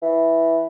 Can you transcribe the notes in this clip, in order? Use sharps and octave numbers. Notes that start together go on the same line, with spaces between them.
E3